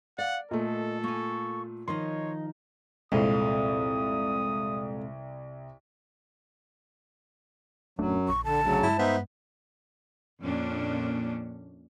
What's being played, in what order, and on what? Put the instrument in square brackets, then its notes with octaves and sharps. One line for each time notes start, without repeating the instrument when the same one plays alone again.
[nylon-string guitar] D5 [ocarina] F5 [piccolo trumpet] F#5
[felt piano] A#2 A3 [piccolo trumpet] A4 [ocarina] D#5
[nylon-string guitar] A#3 G#5 [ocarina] C#6
[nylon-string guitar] D#3 F3 D#4 [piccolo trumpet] C#5 [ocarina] D#5 [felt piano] C6
[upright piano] C2 [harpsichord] F2 [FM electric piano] A#2 G#3 C4 [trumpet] D#6
[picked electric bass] D#1 A3 D4 [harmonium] F#2 F#3
[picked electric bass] A#1 [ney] C#6
[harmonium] D3 [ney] A5
[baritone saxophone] D2 [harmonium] C#3 F#3
[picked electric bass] G2 G#3 [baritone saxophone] E4
[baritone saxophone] B3 [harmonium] D#4 C5 E5
[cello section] F2 A#2 C#4 D4